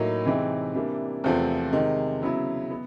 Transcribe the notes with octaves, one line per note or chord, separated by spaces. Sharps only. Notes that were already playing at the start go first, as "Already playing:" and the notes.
Already playing: A2 F#3 A#3 D#4
C3 E3 G#3 C4 D#4
C3 E3 G3 A#3 D4
E2 C3 F3 A3 C4
C3 D#3 G#3
C#3 F#3 B3 E4
B3